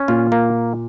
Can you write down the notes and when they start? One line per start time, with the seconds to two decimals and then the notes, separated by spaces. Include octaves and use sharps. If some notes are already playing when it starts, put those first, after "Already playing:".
Already playing: C#4
0.08 A#2 F4
0.32 A#3